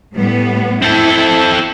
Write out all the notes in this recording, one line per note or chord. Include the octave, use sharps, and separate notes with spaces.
A2 G3 B3
C4 E4 A4